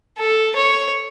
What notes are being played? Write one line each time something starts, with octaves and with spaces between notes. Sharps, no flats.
A4
C#5